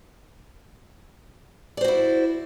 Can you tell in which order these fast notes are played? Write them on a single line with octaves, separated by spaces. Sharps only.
D5 C5 F#4 E4